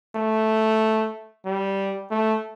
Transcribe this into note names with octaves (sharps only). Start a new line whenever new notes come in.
A3
G3
A3